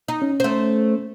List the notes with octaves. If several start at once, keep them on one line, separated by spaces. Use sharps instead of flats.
D#4
C#4
A3 C5